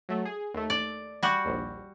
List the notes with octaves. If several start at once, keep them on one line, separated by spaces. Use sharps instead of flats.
F#3 A3
G#4
D#2 A3
D5
G3 F#4
A#1 D#2